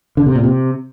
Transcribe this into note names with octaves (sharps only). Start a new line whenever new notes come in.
D3
C3
A#2
C3